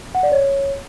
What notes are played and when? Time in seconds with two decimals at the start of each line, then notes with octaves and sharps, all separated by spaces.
0.15 F#5
0.23 D5
0.32 C#5